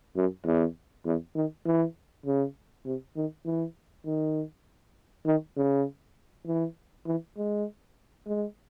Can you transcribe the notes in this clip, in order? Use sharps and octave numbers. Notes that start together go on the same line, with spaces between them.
F#2
E2
E2
D#3
E3
C#3
C3
D#3
E3
D#3
D#3
C#3
E3
E3
G#3
G#3